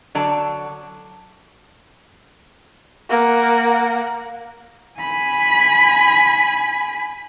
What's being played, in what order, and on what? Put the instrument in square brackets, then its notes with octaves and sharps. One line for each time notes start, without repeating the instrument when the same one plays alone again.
[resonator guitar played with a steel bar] D3 F#3 D5 A5
[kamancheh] A#3 F#5
[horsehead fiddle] G#5 B5